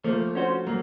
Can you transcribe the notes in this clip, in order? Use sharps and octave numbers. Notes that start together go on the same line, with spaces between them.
F3 A3 A#3
C#4 F#4 C5
F#3 A#3